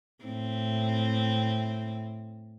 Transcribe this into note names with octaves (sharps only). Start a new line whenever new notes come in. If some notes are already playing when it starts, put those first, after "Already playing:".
A2 C4